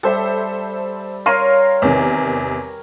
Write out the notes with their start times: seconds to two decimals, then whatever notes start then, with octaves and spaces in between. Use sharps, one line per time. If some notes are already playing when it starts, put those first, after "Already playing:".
0.03 G3 A4 C5 E5
1.26 A#4 C#5 F5 C6 D#7
1.82 E2 C3 D#3